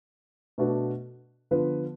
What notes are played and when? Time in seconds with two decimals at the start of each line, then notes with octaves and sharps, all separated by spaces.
0.58 B2 A3 D4 F#4 B4
1.51 D3 F3 B3 F4 B4